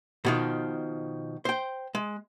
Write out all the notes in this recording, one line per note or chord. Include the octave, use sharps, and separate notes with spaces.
B2 D#3 F3
C5 G5
G#3